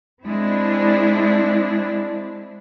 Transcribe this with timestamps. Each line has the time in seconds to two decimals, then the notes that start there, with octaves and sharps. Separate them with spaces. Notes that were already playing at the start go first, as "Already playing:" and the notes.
0.23 G#3 C4 D4 E4